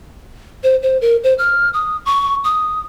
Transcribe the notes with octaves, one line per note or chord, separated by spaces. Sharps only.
C5
C5
A#4
C5
F6
D#6
C#6
D#6